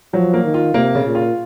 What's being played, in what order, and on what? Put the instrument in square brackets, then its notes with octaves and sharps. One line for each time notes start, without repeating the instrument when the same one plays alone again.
[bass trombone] F3 [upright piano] F#3
[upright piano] A#3
[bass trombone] D#3
[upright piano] F4
[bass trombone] C3 [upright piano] A#3
[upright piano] C#3
[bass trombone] A#2
[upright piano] F4